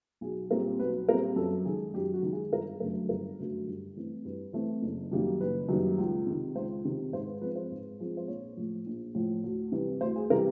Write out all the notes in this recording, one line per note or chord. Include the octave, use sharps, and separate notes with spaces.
B1 G#4
A#2 G3 C4 A#4
B1 B4
A#2 G3 C4 A#4
F#2 A4
D#3 G#3 G#4
F#2 G4
F#4
D#3 G#3
G#4
G1 A#4
F#2 D3 F#3 A3 A#4
G1 A#4
F#2 D3 F#3 A3
G2
E3 A3 C4
G2 B4
E3 A3 C4
F#1
F#2 D#3 G3 A#3
F#1 B4
F#2 D#3 G3 A#3
C#2
C3 D#3
C#2 C5
C3 D#3
G#2 C5
B4
F3 G#3 C4 B4
C5
G#2
F3 G#3 C4
C5
A#1 C#5
A2 F3
A#1
A2 F3
D2
C3 E3 G3
D2 C5
G#4
C3 E3 G3 A#4